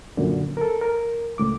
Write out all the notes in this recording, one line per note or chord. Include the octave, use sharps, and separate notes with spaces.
F#2 A#2 D3
A4 A#4
A#4
C#2 A2 D6